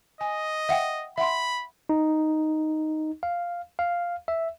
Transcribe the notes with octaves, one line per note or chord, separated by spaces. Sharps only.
D#5 G#5
E5 F#5 G5
E5 F#5 B5 C6
D#4
F5
F5
E5